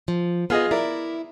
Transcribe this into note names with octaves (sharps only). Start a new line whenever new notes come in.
F3
B3 F4 G#4 D#5
E4 A#4 D5 E5